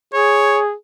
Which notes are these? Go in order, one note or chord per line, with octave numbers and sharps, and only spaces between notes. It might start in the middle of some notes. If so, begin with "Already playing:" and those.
G#4 C#5